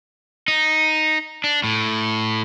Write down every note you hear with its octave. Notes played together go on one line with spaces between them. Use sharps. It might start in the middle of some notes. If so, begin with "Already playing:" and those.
D#4
D4
A2